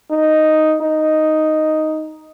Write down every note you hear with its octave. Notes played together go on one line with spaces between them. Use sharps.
D#4
D#4